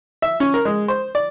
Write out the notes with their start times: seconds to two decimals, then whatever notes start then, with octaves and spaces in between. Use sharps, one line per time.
0.22 E5
0.40 C#4
0.54 A#4
0.65 G#3
0.88 C5
1.15 D5